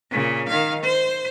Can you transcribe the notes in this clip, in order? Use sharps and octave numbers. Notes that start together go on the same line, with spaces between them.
A#2 C#3
D#3 F5
C5